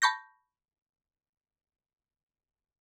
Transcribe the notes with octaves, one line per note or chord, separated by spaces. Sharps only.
A5 B5 C#6 G6 A#6